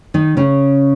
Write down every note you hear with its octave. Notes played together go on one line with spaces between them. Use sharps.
D#3 D#4
C#3 C#4